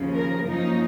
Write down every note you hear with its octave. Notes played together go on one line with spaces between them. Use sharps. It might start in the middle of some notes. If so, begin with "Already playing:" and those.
Already playing: D#2 C#3 F3
A#4
F#2 F3 A#3 C#4 D#4